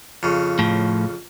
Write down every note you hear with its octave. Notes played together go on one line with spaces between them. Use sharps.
F2 C#3
A2 F3